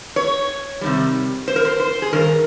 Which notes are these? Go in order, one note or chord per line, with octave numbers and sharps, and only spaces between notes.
C#5
C3 D#3 G3
C5
A#4
C5
C5
G#4
G2 D#3 A#4